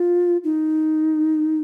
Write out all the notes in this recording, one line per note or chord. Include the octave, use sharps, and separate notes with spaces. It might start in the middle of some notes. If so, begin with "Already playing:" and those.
Already playing: F4
D#4